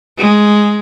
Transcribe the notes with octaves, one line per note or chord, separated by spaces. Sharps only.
G#3